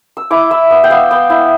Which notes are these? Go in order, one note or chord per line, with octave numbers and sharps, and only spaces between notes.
E6
E4 D6
E4 E6
B3
G5
B3 F5
B3 G5
E4